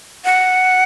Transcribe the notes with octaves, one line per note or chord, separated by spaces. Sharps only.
F#5